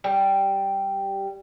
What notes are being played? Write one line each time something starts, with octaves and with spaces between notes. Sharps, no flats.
G3